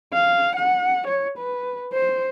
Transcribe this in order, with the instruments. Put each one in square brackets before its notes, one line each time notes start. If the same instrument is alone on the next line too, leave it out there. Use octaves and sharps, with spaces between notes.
[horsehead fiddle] F5
F#5
C#5
B4
C5